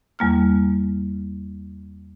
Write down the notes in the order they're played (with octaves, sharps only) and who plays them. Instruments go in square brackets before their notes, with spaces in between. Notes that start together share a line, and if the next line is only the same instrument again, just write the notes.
[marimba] E2 G3 A#3 F6